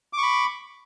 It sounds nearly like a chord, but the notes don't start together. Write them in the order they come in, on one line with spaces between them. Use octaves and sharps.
D6 C#6 B5